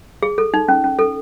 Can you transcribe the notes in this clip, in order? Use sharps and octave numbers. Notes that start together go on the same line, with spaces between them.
G#4
A4
D#4
C#4
C#4
A4